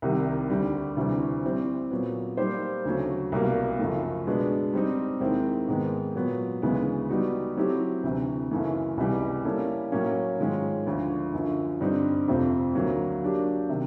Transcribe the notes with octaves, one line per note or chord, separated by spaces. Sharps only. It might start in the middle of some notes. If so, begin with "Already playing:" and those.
C2 C3 D#3 G3
D2 D3 G3
D2 C3 E3 G3 C4
G3 C4 E4
A#2 F#3 B3
G3 A#3 D#4 G4 C5
D2 C#3 F#3 A3
C2 B2 G3 A#3
F#2 C#3 F3 A3
B2 G#3 B3 D4
G3 C4 D#4
D#2 D#3 G#3 C4 E4
G#2 D#3 G#3 B3
A#2 F#3 B3
D2 C#3 E3 G#3 B3
G3 B3 D#4 F#4
F#3 A3 C4 E4 G4
D2 C3 E3
F#2 C#3 E3 A3
C#2 C3 E3 G3
G3 A#3 C#4 E4 A4
A2 F#3 A#3 C#4
G#2 D#3 G#3 C#4 F4
D2 D3 F3
F#2 D3 F3
G2 D3 G3 C4 D#4
F2 C3 F3 A3 C4
D2 D3 F#3 A#3
F#3 A#3 D4 G4
C3 D#3